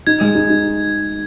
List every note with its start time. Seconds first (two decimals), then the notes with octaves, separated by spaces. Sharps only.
0.07 D#4 G#6
0.21 G#3
0.35 D#4
0.49 D#4